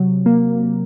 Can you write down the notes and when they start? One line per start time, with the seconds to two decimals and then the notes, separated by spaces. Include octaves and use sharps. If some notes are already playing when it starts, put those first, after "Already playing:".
Already playing: C3 F#3
0.26 A#3